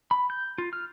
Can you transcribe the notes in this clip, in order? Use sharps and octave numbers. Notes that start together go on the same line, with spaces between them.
B5
G6
F4
F6